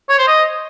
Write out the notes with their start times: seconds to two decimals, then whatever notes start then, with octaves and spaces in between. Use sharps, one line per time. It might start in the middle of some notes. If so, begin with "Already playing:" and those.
0.09 C#5
0.18 C5
0.28 D#5